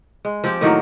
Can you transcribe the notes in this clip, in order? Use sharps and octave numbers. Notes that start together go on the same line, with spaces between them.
G#3
F3 C4 G4
A2 D#3 F#3 A#3